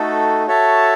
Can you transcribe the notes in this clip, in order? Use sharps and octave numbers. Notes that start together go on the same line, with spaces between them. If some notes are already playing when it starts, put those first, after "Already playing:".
Already playing: A3 D#4 F#4 A4
F#4 A4 C#5 E5 A5